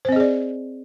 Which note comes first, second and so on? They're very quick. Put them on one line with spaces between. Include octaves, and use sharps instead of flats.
C5 C4 D#5 G#4 D5